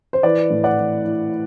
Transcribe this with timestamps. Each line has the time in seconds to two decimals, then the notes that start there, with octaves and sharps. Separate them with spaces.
0.13 C5
0.23 E3 B4 D5
0.50 A2
0.64 D5 F#5
0.78 E3
1.05 E3